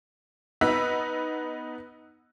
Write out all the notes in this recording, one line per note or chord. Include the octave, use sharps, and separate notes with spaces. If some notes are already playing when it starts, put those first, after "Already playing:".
B3 D#4 B4 E6 F#6 B6